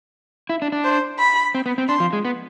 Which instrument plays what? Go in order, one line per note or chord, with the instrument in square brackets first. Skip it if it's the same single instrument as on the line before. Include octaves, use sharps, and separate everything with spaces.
[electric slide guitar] E4
D4
D4
[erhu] C5
B5
[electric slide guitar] C4
B3
C4
[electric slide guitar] D4 [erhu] C6
[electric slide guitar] F3
G#3
B3